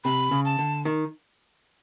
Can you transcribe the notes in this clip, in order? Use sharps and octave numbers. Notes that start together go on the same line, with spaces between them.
C3 B5
C#3
A5
D3
D#3